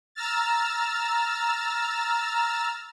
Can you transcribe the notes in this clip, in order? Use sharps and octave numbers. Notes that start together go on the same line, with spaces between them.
A#5 E6 F6 A6